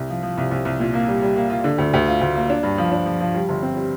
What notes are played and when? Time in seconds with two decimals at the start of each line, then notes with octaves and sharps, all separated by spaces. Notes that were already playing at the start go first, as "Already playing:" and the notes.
Already playing: C2
0.09 F3
0.23 F3
0.38 C2
0.51 C2
0.65 C2
0.80 A#2
0.94 A#3
1.08 G3
1.22 G3
1.36 A#3
1.50 F4
1.64 D3
1.78 D2
1.93 D2
2.07 F4
2.21 D2
2.36 A#3
2.50 D4
2.63 G2
2.78 F3
2.92 D4
3.06 F3
3.21 F3
3.34 G3
3.49 G1
3.62 C4
3.77 G3